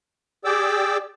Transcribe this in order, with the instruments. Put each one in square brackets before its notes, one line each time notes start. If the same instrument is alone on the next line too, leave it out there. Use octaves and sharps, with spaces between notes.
[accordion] G4 G#4 D5 G5 D6 E6